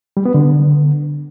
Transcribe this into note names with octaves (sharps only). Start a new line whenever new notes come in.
G3
B3
D3